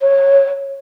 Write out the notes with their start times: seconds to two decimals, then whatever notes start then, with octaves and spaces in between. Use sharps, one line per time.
0.01 C#5